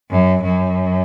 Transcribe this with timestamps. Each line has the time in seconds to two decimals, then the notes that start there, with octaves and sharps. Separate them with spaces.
0.11 F#2
0.43 F#2